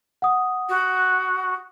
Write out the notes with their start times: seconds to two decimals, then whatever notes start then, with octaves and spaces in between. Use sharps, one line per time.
0.22 F#5 D#6
0.69 F#4